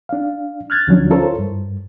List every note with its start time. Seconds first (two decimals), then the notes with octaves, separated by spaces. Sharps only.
0.09 D4 F5
0.70 F6 F#6 G#6 A6
0.87 D2 D3 F3 F#3 C#4 D4
1.10 E4 F4 A4 A#4 C5 C#5
1.39 G2